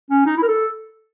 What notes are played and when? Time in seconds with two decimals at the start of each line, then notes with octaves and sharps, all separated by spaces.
0.10 C#4
0.26 D#4
0.37 E4
0.42 A#4
0.48 A4